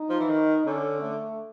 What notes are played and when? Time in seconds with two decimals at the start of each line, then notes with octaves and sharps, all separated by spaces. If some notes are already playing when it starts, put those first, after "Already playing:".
Already playing: D#4
0.10 F3
0.20 E3
0.29 D#3
0.66 D3 C#4
1.01 A3